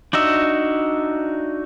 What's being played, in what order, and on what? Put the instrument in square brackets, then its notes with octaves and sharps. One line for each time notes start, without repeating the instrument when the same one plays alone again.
[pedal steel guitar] D4 D#4 F#4 E5